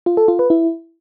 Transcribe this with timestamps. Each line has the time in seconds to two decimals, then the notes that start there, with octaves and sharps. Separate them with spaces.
0.06 F4
0.17 A4
0.28 F4
0.39 B4
0.50 E4